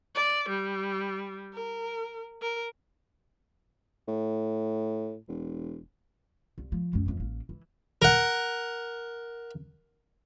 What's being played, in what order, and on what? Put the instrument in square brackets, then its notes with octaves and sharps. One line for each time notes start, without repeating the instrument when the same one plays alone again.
[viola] D5
G3
A#4
A#4
[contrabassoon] A2
E1
[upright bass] C2
F3
C#2 F#2
F2 E3
A1 A#3
E3
[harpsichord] A#4 F#5